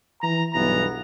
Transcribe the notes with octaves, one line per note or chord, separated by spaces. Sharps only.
E3 A#5
B1 G2 E3 B3 A#5